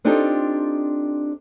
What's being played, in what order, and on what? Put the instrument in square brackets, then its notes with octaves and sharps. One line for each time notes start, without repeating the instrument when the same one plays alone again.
[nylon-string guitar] C4 D4 D#4 F4 G4 A4